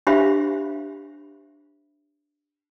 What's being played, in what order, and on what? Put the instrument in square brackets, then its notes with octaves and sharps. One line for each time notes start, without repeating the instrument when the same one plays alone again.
[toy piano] D4 G4 C5 E5 F5 B5